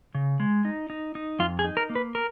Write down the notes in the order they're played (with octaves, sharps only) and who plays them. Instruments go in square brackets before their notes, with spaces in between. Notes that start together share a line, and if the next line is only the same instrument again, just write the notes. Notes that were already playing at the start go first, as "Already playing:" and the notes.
[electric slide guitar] C#3
G#3
D#4
D#4
D#4
F2 F4
G#4
D#4
A#4
A#3
B4
A#4